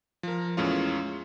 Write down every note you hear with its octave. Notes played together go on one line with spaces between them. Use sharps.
F3 A#4
E2 A2 G#3 C#4 F4